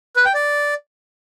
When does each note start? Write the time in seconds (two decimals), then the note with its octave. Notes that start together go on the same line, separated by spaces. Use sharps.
0.16 B4
0.25 G5
0.34 D5